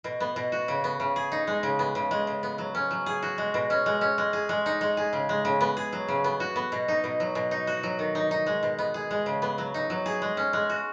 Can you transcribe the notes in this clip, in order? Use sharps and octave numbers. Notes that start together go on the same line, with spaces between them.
B2
B3
B2
F#4
C#3
B3
C#3
G#4
D#4
G#3
C#3
B3
C#3
G#3
C#3
B3
F#3
C#4
F#3
G#4
F#4
G#3
B2
C#4
G#3
C#4
G#3
G#4
G#3
D#4
G#3
G#4
C#3
G#3
C#3
B3
G#4
F#3
C#3
B3
F#4
B3
B2
D#4
B2
F#3
B2
D#4
F#4
F#3
D#3
D#4
D#4
G#3
B2
B3
G#4
G#3
C#3
B3
F#3
D#4
F#3
G#4
G#3
C#4
G#3
F#4